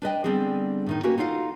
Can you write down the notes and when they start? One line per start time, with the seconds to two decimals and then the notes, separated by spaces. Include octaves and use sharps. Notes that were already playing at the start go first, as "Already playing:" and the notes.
0.02 D4 B4 D#5 G5
0.24 D3 G3 B3 C4 G#4
0.86 A2 D#3 D#4
1.03 A#3 C#4 F#4 G4 A#4 B4
1.18 D#4 F4 A4 F5 F#5